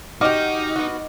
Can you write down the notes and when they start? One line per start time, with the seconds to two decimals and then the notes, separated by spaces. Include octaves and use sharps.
0.21 D#4 F#4 G4 D#5 D6 F6
0.76 B3 F#4